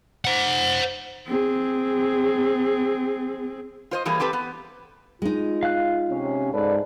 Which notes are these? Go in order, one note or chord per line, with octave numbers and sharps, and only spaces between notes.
C5 F#5
C4 G#4
F4 C5 D#5
E3 G3 A#3 G#4
C4 G4 A4 B4
B3
G#3 D#4 F4
F5 F#6
C3 C#4
G#2 A4 B4 D5